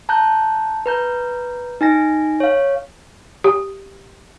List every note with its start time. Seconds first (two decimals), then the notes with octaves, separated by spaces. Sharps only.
0.09 A5 A#5 F#6 G6
0.86 B4 A#5 G6
1.81 D#4 G#5 A#6
2.40 C#5 F5
3.44 G4